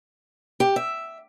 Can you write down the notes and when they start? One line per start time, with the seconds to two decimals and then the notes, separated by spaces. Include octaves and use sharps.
0.60 G4
0.76 E5